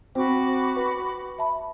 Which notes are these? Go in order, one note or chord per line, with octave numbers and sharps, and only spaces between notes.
C4 F#4 C5 B5 D6
B4
E5 A5 B5